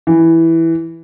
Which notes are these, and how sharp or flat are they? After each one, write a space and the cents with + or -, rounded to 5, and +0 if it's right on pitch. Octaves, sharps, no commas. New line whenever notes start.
E3 -5